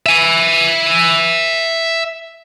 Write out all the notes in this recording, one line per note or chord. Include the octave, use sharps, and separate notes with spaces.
E5 G#5